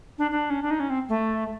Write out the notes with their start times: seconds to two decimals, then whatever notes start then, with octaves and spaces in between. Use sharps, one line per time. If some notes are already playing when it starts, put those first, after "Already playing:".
0.18 D4
0.31 D4
0.50 C#4
0.62 D4
0.71 D#4
0.80 C#4
0.90 C4
1.09 A3